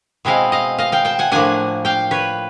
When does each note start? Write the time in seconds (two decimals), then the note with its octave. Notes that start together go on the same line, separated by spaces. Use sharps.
0.25 B2 G#3 C4 E4 D#5 F5
0.52 D#5 F5
0.78 D#5 F5
0.92 F5 G5
1.05 G5 A5
1.19 F#5 G#5
1.31 A2 F3 A#3 D4 F#5 G#5
1.85 F5 G5
2.11 B4 C#5